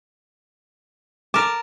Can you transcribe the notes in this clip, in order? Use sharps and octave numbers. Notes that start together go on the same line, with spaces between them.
A#4 A5 D6